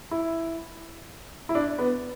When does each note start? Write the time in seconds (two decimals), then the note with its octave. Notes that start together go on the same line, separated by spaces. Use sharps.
0.11 E4
1.49 E4
1.55 D4
1.79 B3